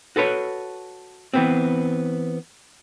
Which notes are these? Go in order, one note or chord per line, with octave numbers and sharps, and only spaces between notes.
F#4 A4 B4 C#5
E3 B3 C4